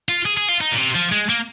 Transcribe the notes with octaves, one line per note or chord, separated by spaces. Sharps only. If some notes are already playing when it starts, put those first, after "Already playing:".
F4
G#4
G#4
F4
D#4
A#2
C3
F3
G#3
A#3